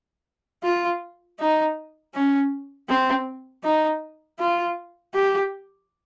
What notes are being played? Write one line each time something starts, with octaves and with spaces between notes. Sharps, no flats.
F4
D#4
C#4
C4
D#4
F4
G4